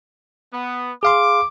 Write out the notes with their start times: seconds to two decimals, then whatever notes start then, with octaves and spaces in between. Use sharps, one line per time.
0.53 B3
1.03 G#4 F5 C6 D6